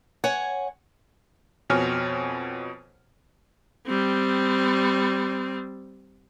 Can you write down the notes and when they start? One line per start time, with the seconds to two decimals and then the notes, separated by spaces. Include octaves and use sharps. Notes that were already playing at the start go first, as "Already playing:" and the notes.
0.24 C#5 F#5 G#5
1.70 F2 B2 C4 C#5 G#5 F6
3.86 G3 C4